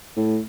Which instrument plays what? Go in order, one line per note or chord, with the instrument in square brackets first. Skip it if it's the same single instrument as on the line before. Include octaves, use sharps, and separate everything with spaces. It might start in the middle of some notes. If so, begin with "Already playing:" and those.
[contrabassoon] A2